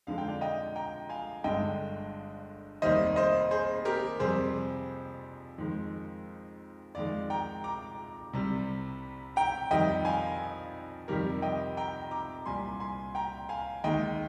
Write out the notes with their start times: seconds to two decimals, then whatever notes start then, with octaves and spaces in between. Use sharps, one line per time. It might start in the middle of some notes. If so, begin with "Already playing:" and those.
0.07 F2 D3 F3 G#3 F5
0.18 G5
0.28 D5 F5
0.41 D#5 G5
0.76 G5 A#5
1.09 F5 G#5
1.44 G1 G2 D3 G#3 D#5 G5
2.82 F1 D#2 D#3 G3 C5 D#5
3.16 C5 D#5
3.51 G#4 C5
3.85 G4 A#4
4.20 F2 C3 G3 G#4 C5
5.58 F2 D#3 G#3
6.95 F2 D#3 G#3 D5 F5
7.30 G5 A#5
7.64 A#5 D6
8.33 C2 C3 G3
9.36 G5 A#5
9.71 F2 D#3 G3 D#5 G5
10.05 F5 G#5
11.08 F2 C3 D#3 G3 G4 A#4
11.42 D#5 G5
11.77 G5 A#5
12.11 A#5 D6
12.46 C2 A#2 G3 G#5 C6
12.80 G#5 C6
13.15 G5 A#5
13.49 F5 G#5
13.84 D#2 D#3 G#3 D#5 G5